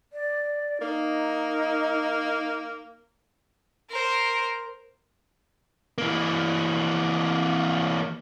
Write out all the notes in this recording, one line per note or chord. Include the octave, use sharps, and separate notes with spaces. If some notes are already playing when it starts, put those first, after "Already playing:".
D5
A#3 D#4
A#4 C5
E3 A#3